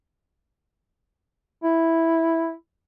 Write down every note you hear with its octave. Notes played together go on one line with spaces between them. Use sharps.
E4